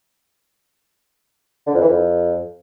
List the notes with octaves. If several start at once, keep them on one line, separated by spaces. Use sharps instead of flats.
D3
F2
E3
F2